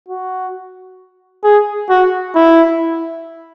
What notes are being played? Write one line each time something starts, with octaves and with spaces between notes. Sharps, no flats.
F#4
G#4
F#4
E4